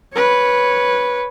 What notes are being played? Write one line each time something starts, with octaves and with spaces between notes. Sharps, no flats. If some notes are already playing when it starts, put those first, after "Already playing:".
B4 C#5